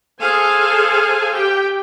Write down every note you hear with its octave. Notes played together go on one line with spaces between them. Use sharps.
G#4 A4 C5 F5 G#5
G4 G5